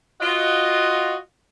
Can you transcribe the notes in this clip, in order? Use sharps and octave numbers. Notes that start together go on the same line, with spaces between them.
F4 F#4 D#5